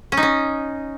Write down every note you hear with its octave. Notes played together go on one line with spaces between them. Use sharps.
C#4
D#4
C#4